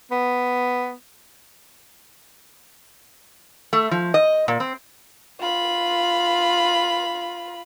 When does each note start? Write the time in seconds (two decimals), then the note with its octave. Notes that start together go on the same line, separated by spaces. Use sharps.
0.11 B3
3.73 A3
3.91 F3
4.14 D#5
4.48 A#2
4.60 C4
5.40 F4 B5